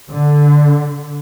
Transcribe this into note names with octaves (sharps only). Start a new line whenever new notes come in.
D3